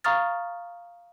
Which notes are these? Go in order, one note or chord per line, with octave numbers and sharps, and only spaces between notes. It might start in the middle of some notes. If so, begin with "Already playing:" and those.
F5 A#5 C#6 D#6 F6 A6